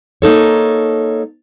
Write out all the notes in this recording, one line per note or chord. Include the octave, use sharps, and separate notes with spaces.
A#3 D#4 A4 C#5